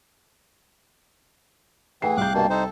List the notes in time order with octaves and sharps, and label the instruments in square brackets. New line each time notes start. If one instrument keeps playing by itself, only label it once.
[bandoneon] E3 [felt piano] A3 F#5 C7 [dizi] G#4 [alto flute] G5
[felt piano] C2 G6 [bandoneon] F5 D6 F#6
[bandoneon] G2 B2 A#3 [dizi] A5
[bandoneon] D#4 C5 [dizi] A4